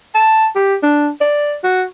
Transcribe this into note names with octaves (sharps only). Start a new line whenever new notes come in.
A5
G4
D4
D5
F#4